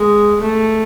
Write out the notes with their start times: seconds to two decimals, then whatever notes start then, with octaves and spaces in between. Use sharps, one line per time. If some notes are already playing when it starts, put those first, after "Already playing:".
Already playing: G#3
0.41 A3